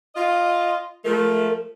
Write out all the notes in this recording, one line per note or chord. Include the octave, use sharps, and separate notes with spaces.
F4 D#5
F3 G#3 A3 A#4